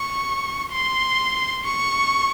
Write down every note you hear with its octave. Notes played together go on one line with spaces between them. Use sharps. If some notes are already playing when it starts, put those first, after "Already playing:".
Already playing: C#6
C6
C#6